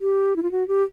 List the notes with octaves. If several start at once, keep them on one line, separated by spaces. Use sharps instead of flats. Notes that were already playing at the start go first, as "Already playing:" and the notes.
G4
E4
F4
F#4
G4